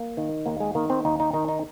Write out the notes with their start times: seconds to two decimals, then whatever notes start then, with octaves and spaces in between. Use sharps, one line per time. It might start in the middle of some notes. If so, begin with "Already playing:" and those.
Already playing: A#3
0.17 D#3
0.46 D#2 A#3
0.60 G#3
0.75 D#3 A#3
0.90 C4
1.05 D#2 D#4
1.20 D#4
1.33 D#3 D#4
1.48 D#4